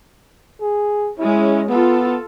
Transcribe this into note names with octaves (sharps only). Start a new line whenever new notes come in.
G#4
G#3 C#4 E4
B3 F4 A4